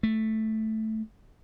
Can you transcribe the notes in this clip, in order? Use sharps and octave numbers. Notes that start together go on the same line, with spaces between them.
A3